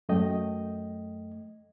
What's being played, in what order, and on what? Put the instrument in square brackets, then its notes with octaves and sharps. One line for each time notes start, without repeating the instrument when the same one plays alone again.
[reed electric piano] F#2 A3 D#5 G5